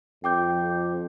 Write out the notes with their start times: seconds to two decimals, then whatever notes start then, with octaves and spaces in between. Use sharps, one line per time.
0.24 F2 G5 D6 G6